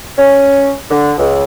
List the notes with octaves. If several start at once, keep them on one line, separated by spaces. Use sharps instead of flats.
C#4
D3
C#2